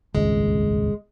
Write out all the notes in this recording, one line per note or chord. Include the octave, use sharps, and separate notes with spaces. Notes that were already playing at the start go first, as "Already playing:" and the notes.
D#1 G#1 C#2 G#3